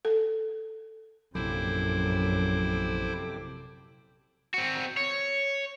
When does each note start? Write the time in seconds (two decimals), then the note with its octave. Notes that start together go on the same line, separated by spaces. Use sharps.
0.05 A4
1.35 A#1 F#2 C3 F#3 E4 A4 C5 D6
4.54 C4 F#4
4.97 C#5